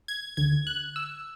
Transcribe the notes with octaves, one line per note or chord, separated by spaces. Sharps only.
G#6
D2 D3 G#6
F#6
E6